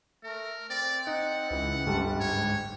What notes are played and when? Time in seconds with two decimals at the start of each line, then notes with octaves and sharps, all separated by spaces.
0.23 A3 A#4
0.70 C4 D5
1.07 D#4 F#5
1.51 C#2 E3
1.86 G1 G3 G4 A5
2.20 G#2 C#5